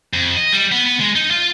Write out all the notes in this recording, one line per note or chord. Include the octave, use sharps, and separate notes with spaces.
F2
D#5
G3
B3
B3
G#3
D#4
F4